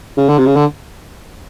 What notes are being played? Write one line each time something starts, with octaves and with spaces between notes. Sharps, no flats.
C#3
D3
C3
C#3
D3